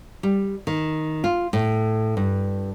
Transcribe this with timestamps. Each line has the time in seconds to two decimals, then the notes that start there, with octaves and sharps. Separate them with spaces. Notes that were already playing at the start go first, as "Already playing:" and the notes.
0.23 G3
0.67 D#3
1.24 F4
1.53 A2
2.17 G2